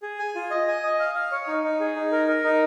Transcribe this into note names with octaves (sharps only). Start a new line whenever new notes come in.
G#4
G#5
F4
D#5
G#5
D#5
F5
F5
C#5
D#4
D#4
G#4
D#4
A#4
A#4
D#4